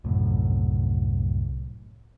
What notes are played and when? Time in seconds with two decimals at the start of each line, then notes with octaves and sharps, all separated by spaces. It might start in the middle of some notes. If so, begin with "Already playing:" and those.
0.04 C2 F#2 A2